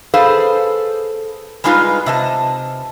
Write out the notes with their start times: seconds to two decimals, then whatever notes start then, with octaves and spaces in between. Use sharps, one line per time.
0.14 G#4 A4 B4 C5 F5
1.64 G3 G#3 D#4 F4 B4
2.06 C3 D#5 A5